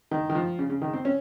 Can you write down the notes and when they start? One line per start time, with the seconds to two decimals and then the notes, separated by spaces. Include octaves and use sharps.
0.11 D#3
0.30 D#3
0.35 F3
0.59 C#3
0.70 C#3
0.82 D#3
0.93 C4
1.05 C#4